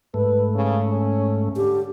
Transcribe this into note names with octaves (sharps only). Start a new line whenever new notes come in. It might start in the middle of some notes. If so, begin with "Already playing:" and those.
G#2 A3 B4
C#3
C#4
D3 G4